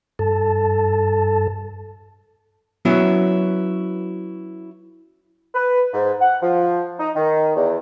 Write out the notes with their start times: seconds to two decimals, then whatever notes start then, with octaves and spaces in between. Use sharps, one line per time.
0.19 G2 A4 A5
2.85 F#3 B3 C#4 E4
5.54 B4
5.94 G#2
6.21 F#5
6.42 F3
6.99 D#4
7.16 D#3
7.56 E2